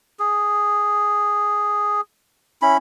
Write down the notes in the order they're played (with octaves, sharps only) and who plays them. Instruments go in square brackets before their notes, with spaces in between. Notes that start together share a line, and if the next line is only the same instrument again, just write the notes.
[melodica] G#4
C#4 E4 B5